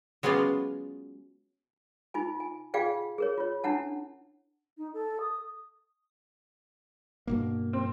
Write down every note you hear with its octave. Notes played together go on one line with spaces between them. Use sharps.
F#3 G#3 B3 C#4 F4 D5
D#4 F4 G#5
G#5
F4 G#4 D5 F5 G5 G#5
G#4 A#4 C#5
F4 C#5
C#4 D4 E4 F#5 A5
D#4
A4
D#6
G2 B2 A#3
C4